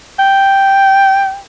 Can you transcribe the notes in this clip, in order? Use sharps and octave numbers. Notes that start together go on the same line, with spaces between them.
G5